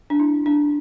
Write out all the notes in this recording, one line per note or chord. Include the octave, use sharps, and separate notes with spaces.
D4
E4
D4